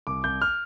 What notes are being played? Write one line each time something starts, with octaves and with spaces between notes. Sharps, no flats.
C2 D6
C2 G6
F6